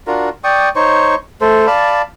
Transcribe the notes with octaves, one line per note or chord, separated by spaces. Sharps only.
D4 F4 F#4 A#4
D5 G5 C#6 D#6
D#4 C5 C#5 C#6
A3 A4 C5
D5 F5 A5 B5